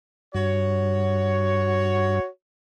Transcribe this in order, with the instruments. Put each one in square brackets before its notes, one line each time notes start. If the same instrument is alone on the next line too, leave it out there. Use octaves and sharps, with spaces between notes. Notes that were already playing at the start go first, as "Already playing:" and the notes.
[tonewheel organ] G2 [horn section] F#4 C#5